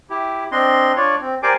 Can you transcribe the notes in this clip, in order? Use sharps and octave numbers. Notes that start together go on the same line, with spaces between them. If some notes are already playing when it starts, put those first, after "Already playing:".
E4 G4
C4 D4 D#5 C6
D4 F4 C#5 D5
C4
G4 A#4 C5 D5 G#5 D6